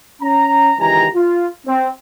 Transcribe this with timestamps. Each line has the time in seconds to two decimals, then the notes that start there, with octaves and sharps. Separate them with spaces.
0.22 C#4 A#5
0.79 C#2 D#3 E3 G4 G#5 A#5
1.15 F4
1.67 C4